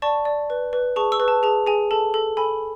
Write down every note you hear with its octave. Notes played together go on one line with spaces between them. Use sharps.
D5 A5 C#6
D5
B4
B4
G#4 A5 C#6
C#6 E6
B4
A5
G#4 A5
G#4 G#5
A4 A5
A4
A4 G#5 B5